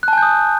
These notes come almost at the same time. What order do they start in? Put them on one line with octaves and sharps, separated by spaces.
F#6 A5 G#5 G6 D#6